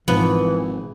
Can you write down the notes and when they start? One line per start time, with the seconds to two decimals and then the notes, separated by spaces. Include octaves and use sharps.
0.08 G#1 G#2 B2 E3 F3 B3